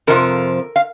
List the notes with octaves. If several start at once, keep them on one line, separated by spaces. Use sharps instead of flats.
F2 C3 F3 A#4
F5